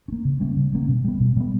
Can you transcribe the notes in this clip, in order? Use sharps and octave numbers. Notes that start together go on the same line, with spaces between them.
C#4
A#3
C#3
G3 A#3 C#4
C#3
G3 A#3 C#4
B2
G3 B3
B2
G3 B3